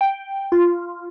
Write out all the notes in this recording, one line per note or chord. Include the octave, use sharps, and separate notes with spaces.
G5
F4